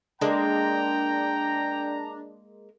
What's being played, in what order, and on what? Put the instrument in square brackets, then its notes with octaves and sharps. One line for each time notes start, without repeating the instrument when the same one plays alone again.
[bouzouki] G#3 A#3 [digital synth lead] D4 [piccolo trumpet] G5 [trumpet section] A#5